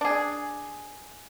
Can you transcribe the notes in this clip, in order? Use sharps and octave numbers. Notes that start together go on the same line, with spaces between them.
D4 G#4